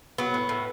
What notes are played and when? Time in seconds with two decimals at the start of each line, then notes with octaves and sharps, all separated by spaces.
0.18 F#3 B3
0.34 A2
0.49 A2